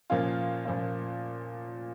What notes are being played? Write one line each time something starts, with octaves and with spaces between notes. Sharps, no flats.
A#2 F3 A#3 C#4 F4
A#2 F3 A#3 C#4 F4